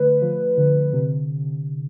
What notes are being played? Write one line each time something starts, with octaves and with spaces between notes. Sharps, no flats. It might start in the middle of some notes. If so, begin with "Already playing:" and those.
Already playing: D3 A3 B4
F3
D3
C3